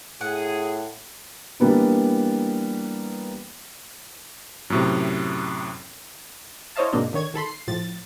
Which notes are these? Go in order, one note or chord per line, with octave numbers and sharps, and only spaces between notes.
A2 G#4 F#5
E3 G3 A#3 B3 D4
F#2 A2 C3
E4 C5 C#5 D#5 F5 A5
G#2 B2 A#3 C4 D4 D#4
D3 D#3 C#5 G#6
D#3 A4 B5 C6
C7
A2 F3 A6